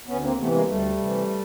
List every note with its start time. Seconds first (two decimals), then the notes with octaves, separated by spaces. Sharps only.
0.07 D2 B3 C#4
0.22 A#3 C4
0.37 C3 E3 A3 B3
0.52 G#3 A#3
0.67 D2 G3 A3
0.98 C3 E3